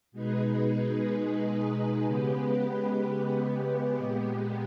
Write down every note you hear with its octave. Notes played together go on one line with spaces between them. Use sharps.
B2 G#3 D#4 G#4 B4
C#3 G#3 B3 G4 B4
A#2 G#3 B3 G4